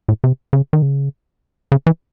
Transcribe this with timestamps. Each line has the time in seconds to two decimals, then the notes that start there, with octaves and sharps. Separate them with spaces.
0.08 A2
0.24 C3
0.53 C#3
0.73 D#3
0.82 C#3
1.72 C#3
1.87 E3